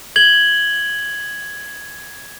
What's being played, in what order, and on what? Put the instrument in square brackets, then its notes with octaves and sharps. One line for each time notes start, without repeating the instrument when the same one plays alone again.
[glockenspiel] G#6 F#7 G7